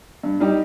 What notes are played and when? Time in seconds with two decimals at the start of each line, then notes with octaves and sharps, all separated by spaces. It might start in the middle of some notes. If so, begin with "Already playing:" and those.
0.23 G2
0.40 G3 D#4 G4